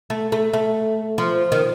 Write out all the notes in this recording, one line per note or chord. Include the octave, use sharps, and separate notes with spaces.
A3
A3
A3
F3
D#3